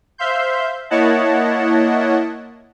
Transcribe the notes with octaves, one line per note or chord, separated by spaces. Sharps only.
C5 E5 F5 C6 G6
A#3 E4 C#5 D#5 F#5 A5